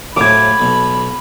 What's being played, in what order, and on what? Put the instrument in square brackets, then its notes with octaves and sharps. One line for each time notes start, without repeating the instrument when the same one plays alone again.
[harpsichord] A2 F3 F#3 [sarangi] B5 [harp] D6 G#6
[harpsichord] B1 B2